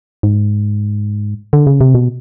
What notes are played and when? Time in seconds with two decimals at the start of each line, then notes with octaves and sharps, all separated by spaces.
0.23 G#2
1.53 D3
1.67 C#3
1.81 C3
1.95 B2